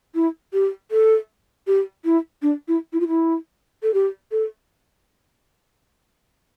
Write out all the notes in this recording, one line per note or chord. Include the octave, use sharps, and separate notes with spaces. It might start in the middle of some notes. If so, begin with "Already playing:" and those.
E4
G4
A4
G4
E4
D4
E4
E4
F4
E4
A4
G4
A4